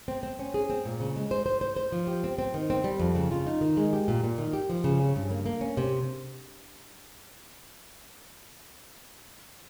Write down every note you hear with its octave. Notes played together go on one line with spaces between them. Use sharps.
C4
C4
C#4
G#4
C4
A#2
C#3
G#3
C5
C5
C5
C5
F3
G4
C4
C4
D#3
C4
G3
F2
C#3
F4
D#4
D#3
G#3
G4
A#2
A#2
D#3
G4
F3
C#3
C#4
G2
A#3
A#3
C#4
C3